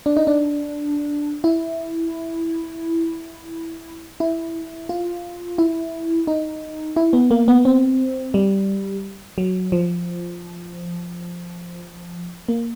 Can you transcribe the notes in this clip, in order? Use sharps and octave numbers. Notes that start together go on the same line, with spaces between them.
D4
D#4
D4
E4
E4
F4
E4
D#4
E4
B3
A#3
B3
C4
G3
F#3
F3
A#3